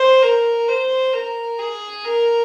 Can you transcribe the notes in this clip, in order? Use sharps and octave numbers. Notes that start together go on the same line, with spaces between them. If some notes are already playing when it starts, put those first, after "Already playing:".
Already playing: C5
A#4
C5
A#4
G#4
A#4